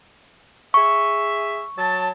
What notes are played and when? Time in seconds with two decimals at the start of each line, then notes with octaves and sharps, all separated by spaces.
0.74 G#4 E5 C#6
1.78 F#3 A5